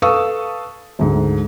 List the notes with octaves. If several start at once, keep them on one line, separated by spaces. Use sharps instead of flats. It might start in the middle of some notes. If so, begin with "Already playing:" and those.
A4 B4 F5 C#6 D#6 E6
D2 G#2